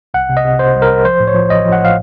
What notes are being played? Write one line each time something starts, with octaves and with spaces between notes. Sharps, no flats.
C2 F#5
C3
D#5
C3
C3 C5
C2
A#4
C2
F3 C5
A2
C#5
F3
A1 D#5
F3
F#5
A2 F5